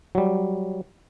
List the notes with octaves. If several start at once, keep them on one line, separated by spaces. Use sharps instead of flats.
F#3 G3